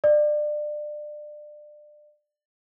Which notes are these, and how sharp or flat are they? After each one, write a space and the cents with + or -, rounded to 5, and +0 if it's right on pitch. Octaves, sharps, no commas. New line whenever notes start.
D5 +25